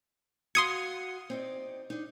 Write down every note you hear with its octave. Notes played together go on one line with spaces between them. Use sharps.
F#4 F5 C6 D#6 G#6 C#7
C4 D#4 D5
D4 D#4